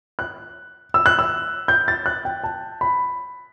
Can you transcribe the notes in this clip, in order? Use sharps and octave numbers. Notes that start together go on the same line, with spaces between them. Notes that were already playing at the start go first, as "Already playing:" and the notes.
F#6
E6
F#6
E6
G6
A6
F#6
G5
A5
B5